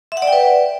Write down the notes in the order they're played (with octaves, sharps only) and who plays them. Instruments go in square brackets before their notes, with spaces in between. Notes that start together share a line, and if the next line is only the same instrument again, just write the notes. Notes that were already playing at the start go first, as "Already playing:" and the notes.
[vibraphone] E5
F#5
D5
G5
B4